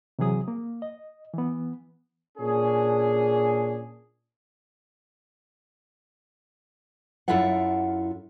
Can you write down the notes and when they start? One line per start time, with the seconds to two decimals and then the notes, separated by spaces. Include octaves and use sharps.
0.19 C3 E3 F#3 G#4 D#6
0.48 A#3
0.82 D#5
1.34 E3 B3
2.38 A#2 C#4 D4 G#4
7.28 F#2 E4 F4 A4 E5 F#5